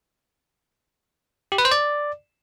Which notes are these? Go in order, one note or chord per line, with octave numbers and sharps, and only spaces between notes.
G4
B4
C5
D5